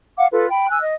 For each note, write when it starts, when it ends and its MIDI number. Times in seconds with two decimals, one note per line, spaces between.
0.17 0.27 77
0.17 0.27 78
0.17 0.27 86
0.31 0.47 65
0.31 0.47 69
0.31 0.47 71
0.50 0.66 79
0.50 0.66 83
0.69 0.81 80
0.69 0.81 88
0.69 0.81 90
0.81 0.94 75